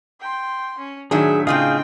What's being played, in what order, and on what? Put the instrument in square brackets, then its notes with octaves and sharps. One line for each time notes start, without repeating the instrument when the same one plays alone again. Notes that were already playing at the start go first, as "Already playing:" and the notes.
[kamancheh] G5 C6
C#4
[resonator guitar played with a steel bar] A2 D#3 F#3 [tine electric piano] D4 [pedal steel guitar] G#4 [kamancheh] E5
[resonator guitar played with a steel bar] A2 C#3 F4 [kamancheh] C4 G5 [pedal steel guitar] G#4 D#5 F5